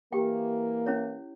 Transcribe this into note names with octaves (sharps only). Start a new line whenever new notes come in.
E3 A#3 G4 G5
C#4 E4 C#5